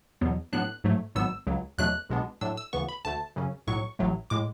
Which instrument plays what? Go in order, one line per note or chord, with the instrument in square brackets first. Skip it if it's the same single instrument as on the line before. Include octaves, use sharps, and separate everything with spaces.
[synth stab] E2 B2 F#3 B3
A2 F#3 B3 D4 F#6
G#2 F#3 A3
G#1 G#2 F#3 B3 E6
C#2 C#3 F#3
E2 B2 F#3 A3 D4 F#6
B1 B2 G#3 B3 D4
A2 F#3 A3 D4 E6
E6
D2 C#3 E3 B3 C#6
B5
D2 D3 A3 A5
F#2 C#3 F#3 C#4
B1 A2 F#3 C#6
A1 A2 F#3 A3
A2 G#3 D6